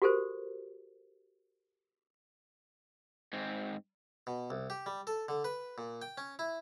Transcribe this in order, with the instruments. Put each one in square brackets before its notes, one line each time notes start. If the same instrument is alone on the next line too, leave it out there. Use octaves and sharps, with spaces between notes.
[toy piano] F#4 G4 A4 A#4 C5
[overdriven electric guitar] G#2 C4
[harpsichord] B2
C2
G4
G3
A4
D3
B4
A#2
G5
C#4
E4